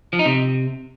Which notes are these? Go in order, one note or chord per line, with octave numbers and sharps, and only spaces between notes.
F3
D#4
C3